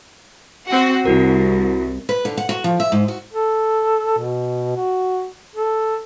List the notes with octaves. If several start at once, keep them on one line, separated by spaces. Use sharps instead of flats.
C4 F#4 F#5
C2 E4 F#4 A#4
B4
D3
F#5
F#4
F3
E5
G#2
F#4
A4
B2
F#4
A4